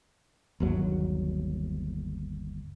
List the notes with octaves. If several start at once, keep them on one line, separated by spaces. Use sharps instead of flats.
G1 D#2 F#3